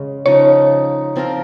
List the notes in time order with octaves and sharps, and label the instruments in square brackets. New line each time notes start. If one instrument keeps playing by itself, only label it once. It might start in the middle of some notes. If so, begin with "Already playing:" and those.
Already playing: [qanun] C#3 G#3 C#4
[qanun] C#3 F3 G#3 D#4 [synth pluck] C#5
[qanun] F3 C4 F4 A#4